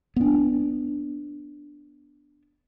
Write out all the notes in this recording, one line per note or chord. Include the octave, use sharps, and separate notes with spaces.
B3 D4